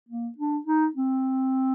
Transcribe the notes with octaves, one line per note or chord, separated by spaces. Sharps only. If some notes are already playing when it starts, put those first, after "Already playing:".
A#3
D4
D#4
C4